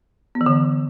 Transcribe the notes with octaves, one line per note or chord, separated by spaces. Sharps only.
B3
E3
D3